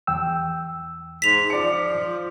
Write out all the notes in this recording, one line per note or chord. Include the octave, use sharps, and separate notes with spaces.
E2 G5 E6
G#2 B6 F7
F3 D5 C#7